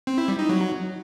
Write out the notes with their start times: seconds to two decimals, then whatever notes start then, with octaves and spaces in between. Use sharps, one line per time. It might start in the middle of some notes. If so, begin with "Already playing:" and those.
0.07 C4
0.18 E4
0.28 G3
0.39 D#4
0.49 F#3